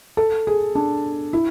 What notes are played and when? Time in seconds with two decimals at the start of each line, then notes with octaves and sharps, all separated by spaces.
0.17 A4
0.47 G#4
0.75 D4
1.33 E4